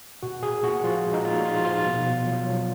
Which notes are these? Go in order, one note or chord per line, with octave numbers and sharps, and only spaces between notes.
A#2 F#4
A#2 G#4
A#2 F#4
F3 F4
G#3
D#4
A#2 F4
F3 F4
F3 F4
B2
B2
F#3
F#3